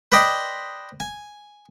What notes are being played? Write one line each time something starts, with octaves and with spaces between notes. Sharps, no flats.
B4 C5 D5 D#5 G5 C6
G#5